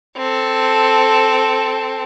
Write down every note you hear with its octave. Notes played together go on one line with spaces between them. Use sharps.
C4 A4